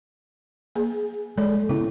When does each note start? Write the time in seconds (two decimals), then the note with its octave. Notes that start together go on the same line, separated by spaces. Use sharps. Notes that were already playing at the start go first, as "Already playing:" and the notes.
0.75 A#3 G#4
1.38 G#3 A4 C#5 D5
1.69 C#3 B3 C#4 E4